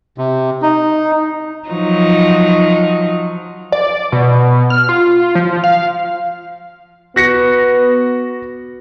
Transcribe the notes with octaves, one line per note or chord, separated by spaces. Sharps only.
C3
D#4
F3 F#3 D#4
D5
B2
F6
F4
F3
F5
B3 F#4 A#6 C#7